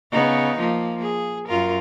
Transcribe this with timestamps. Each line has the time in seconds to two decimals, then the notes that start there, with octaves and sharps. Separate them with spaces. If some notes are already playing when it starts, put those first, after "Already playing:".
0.12 C#3 B3 D#4
0.59 F3 A#3
1.02 G#4
1.48 F#2 F4 A#4